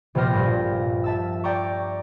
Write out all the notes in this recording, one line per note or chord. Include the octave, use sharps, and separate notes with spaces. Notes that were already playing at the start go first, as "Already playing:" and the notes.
A#1 C3 B3 G5 F6 A#6
G2 A#2
E5 A5 E6
D5 G5 A#5 C#6